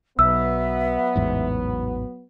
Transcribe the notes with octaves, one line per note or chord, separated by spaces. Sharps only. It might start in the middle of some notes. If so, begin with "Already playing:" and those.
B1 F#3 B3 E5 E6
A1 E2 G#2